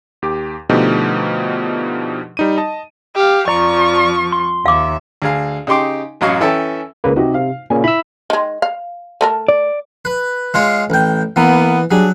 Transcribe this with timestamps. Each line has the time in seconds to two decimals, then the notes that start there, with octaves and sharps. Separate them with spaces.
0.22 D#2 G4 D6
0.69 B2 D3 F3 A3 D#4 G4
2.37 G3 D#4 D#7
2.58 D#5 A5
3.16 G4 F5
3.48 F2 F3 D5 A#5 C#6
4.32 C6
4.66 D#2 E5 F5 D6
5.22 D2 G#4 F5
5.67 C#3 D#4 G4 C6 D6
6.21 A1 F#2 F#3 D#5 F5 C#6
6.41 E3 C#4 A4 E5 G5 A5
7.04 C#2 C#3 A#3 B4
7.16 C3 D#4 F#4 G4
7.34 F5
7.70 A#2 C#3 G#5
7.84 E4 B5 E6
8.30 D#3 G#3
8.62 F5
9.21 A3 A4 A#4
9.48 D5
10.05 B4
10.54 G#3 F4 C#5
10.90 A1 G5
11.36 E3 A#3 B3
11.91 F#3 G3 D4 G#4